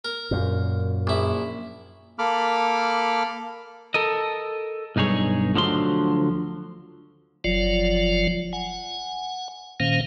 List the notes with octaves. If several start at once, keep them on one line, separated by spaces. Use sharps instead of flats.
A#4
F#2 A#2
A#1 E4
A#3 A4 B5 D6 F6
A4 A#4 D#5
B1 G2 D#4 G#4 C#5
D2 D3 F3 F#3 C6
F#1 F3 F#3 F4 D5
F#5 G#5
A#2 D#3 A#3 C#4 C5 F5